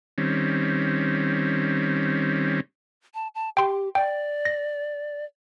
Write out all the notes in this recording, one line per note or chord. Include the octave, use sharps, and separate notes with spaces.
D#3 G3 C4 C#4
A5
A5
G4 G5 C6
D5 G5
A#6